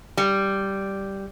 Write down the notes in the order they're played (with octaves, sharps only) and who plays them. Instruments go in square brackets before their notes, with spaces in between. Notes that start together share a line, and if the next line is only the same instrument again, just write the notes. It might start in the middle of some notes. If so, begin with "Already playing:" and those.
[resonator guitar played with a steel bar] G3